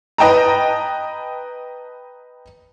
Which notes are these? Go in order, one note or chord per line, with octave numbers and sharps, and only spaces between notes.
B4 D#5 G5 A5 A#5